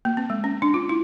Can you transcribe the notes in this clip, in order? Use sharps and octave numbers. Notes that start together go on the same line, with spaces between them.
A#3
C4
G#3
C#4
D4
F4
E4